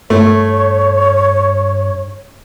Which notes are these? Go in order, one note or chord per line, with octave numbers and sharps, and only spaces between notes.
G2 A3 C#5